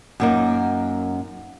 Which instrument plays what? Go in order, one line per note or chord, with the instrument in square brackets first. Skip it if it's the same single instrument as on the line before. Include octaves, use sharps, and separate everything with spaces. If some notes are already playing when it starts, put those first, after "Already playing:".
[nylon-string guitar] F#2 A#3 D#4